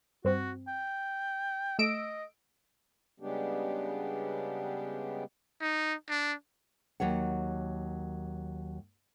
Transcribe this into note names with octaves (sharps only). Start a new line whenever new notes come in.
G2 C4 F#4
G5
A3 D#5 E6 D7
C#3 G3 G#3 B3 D4 G4
D#4
D4
D#2 F#3 C#5 F#5